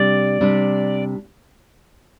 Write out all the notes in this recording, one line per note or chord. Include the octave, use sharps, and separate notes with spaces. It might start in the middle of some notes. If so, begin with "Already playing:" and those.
Already playing: C3 G3 D4 D5
C3 G3 D4